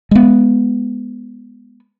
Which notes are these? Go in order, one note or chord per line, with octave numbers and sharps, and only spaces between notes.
G#3 B3